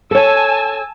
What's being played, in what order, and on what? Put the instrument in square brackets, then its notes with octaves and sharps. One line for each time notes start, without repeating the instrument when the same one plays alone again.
[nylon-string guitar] A4 C#5 [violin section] G#5 A5 E6